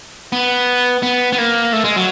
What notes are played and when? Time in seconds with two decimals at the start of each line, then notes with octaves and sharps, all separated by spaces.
0.32 B3
1.03 B3
1.33 B3
1.38 A#3
1.73 A3
1.84 G#3
1.96 F#3